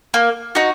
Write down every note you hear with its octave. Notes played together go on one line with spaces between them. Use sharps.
A#3
D#4 F#4